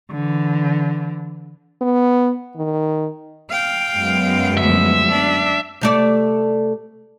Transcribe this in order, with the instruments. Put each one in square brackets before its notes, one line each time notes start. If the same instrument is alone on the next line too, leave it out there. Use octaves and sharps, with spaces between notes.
[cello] D3 E3
[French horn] B3
D#3
[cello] F5 G5
[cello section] F#2 G#3 B3
[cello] D2 F3 [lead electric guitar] E5
[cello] D4
[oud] C3 A3 D5